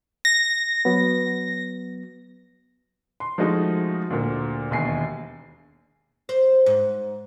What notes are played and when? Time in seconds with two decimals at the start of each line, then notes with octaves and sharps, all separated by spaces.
0.25 A#6
0.85 F#3 B3
3.20 C6
3.38 F3 G#3 A3 D#4 F#4
4.10 D2 A#2
4.71 E1 D#2 G#5 C7
6.29 C5
6.66 G#2